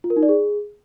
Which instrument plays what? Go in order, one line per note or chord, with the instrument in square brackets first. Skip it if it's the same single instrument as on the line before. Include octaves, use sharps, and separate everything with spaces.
[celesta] F4
A#4
D#4
D5
G#4